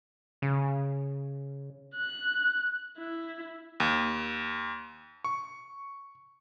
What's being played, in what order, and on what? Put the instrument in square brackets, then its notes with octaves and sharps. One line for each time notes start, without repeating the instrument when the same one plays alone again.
[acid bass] C#3
[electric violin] F#6
E4
[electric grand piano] D#2
C#6